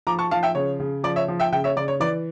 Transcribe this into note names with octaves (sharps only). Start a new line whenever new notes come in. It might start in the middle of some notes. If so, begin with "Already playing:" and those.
F3 A#5 D6
A5 C#6
F3 F5 A5
E5 G5
C#3 C#5
C#3
F3 D5
C#5 E5
F3
E5 G5
C#3 E5 G5
C#5 E5
C#3 D5
C#5
E3 D5